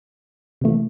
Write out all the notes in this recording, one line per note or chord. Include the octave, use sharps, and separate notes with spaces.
C3 E3 A3